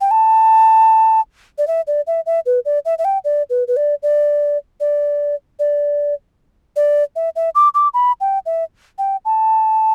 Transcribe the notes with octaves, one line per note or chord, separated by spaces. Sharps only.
G5
A5
D5
E5
D5
E5
E5
B4
D5
E5
E5
G5
D5
B4
B4
D5
D5
D5
D5
D5
E5
E5
D6
D6
B5
G5
E5
G5
A5